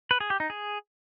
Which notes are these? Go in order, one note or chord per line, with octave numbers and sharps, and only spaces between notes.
B4
G#4
G4
D#4
G#4